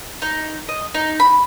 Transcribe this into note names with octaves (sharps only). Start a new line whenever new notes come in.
D#4
D#5
D#4
B5